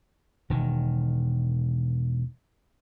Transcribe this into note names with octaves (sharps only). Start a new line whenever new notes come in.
E1 D#3